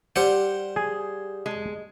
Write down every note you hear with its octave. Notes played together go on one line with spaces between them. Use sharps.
G3 G4 C5 F#5
G#4 G#5
G#3